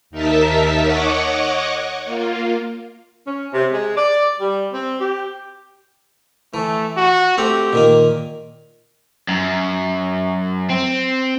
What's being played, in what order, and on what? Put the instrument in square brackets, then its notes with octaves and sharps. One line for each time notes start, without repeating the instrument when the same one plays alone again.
[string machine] D#2 D#4 A#4 E5 A5 B6
C#5 D#5 F#5 C#6 D6
A#3 F4
[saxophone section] C#4
C3
G#3
D5
G3
C4
G4
[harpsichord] E3 [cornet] A3
[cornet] F#4
[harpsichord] A3 C4 A#5 [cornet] G4
[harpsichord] A#2 D#3 A#3
[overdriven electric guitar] F#2
C4